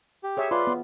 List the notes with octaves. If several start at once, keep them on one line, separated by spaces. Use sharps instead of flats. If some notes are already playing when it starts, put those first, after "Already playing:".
G4
G#4 C#5 E5
F4 B4 D5 C6
B3